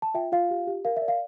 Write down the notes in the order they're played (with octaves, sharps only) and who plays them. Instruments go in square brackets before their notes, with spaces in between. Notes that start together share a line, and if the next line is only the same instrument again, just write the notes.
[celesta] A5
F4 E5 G5
F4 F5
G4
G4
A#4 F5
E5
D5
F5